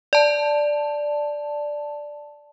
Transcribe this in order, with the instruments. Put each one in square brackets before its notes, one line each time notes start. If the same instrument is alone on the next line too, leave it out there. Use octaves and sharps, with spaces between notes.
[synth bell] D5 A5